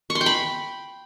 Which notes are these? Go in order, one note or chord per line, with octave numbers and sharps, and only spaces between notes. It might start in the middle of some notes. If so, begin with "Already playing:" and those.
C#6
C6
G5
B5